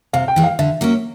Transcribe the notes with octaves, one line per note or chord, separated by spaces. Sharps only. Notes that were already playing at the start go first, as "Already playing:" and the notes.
C3 F5
G5
E3 G#3
F5
D3 E5
F#3 A#3 C#4